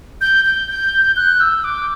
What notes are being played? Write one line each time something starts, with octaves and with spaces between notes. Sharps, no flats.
G6
G6
G6
F#6
E6
D6